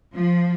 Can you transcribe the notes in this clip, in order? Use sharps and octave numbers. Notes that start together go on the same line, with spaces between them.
F3